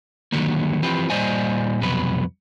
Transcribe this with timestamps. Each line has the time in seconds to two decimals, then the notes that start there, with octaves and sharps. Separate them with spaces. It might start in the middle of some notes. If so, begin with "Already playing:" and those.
0.32 D3 D#3 F#3 G3 A#3
0.82 E3 F3 C4 G4 B4
1.10 A#2 G3 C5 D5 D#5 G#5
1.81 C2 F2 B2 F#3 B4